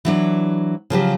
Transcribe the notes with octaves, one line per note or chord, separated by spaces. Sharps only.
E3 F#3 D4
C#3 F3 F#3 G4